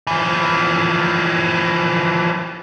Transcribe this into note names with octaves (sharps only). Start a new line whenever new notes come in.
E3 F3